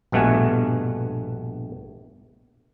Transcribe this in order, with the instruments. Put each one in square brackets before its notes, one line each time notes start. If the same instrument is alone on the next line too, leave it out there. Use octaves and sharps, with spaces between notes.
[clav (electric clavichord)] A#1 G2 B2 A3 F#5 G#5